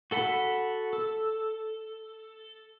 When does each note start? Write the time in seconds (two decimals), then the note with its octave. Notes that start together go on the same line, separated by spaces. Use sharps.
0.11 F#4 A4 F#5 B5
0.93 A4